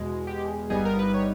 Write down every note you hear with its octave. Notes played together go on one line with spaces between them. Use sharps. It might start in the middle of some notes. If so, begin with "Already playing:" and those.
Already playing: E2 B2 G#3
G4
G1 G2 G3 B3 D#4 G#4
A#4
B4
C#5